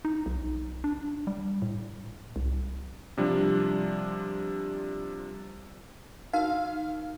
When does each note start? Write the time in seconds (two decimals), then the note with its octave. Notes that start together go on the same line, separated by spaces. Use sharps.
0.05 D#4
0.26 B1
0.84 D4
1.27 G3
1.62 A2
2.36 C2
3.17 C3 F3 G3 D4
6.33 D#4 F#4 A#4 F5